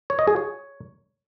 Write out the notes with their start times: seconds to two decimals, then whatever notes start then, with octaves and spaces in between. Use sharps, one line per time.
0.10 C#5
0.19 D#5
0.27 G#4
0.36 C#5